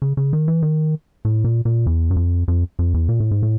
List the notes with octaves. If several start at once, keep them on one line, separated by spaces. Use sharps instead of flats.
C#3
C#3
D#3
E3
D#3
A2
A#2
A#2
E2
F#2
F2
F2
F2
E2
A#2
A2
G#2
A2